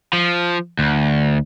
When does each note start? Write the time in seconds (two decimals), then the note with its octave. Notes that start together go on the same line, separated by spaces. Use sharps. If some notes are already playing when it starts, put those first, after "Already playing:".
0.13 F3
0.79 D2